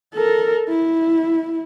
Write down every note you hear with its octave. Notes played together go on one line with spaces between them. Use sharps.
A4 A#4
E4